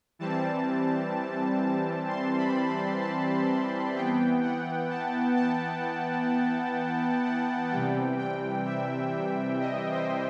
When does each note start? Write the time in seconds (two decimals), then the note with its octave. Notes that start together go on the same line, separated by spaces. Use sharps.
0.19 E3 G3 C4 A5
2.08 C6
2.38 B5
2.70 B5
3.02 A5
3.95 E3 B3 G5
4.43 F#5
4.90 A5
5.36 A5
7.25 F#5
7.72 C3 E3 G3 G5
8.19 G5
8.66 E5
9.60 D#5
9.92 C5